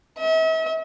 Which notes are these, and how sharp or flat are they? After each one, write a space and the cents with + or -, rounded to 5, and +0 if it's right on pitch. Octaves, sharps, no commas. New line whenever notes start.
E5 -40